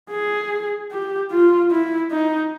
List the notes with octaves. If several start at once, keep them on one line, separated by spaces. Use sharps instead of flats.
G#4
G4
F4
E4
D#4